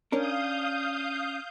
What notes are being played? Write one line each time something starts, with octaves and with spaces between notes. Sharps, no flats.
C#4 D4 A#4 F5 D#6 G6